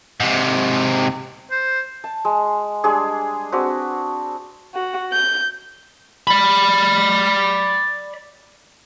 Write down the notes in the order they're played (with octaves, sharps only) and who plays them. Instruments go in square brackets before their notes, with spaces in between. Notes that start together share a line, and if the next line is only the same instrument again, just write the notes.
[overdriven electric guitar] G#2 C3
[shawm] C5
[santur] A5
G#3
G3 G#3 D4 G#4
C4 D4 F#4 B4
[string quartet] F#4
G6
[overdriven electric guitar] D5 B5